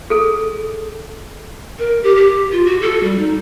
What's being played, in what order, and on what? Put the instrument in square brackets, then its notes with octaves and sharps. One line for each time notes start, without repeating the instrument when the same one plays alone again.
[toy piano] G#4 A4
[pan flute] A#4
G4
G4
F4
F#4
A4
G3
D#4